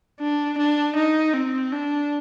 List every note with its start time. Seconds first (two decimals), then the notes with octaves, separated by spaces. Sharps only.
0.20 D4
0.58 D4
0.96 D#4
1.33 C4
1.72 D4